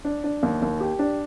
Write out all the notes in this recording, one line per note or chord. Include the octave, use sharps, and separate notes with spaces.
D4
D4
D#2
D#2
G4
D4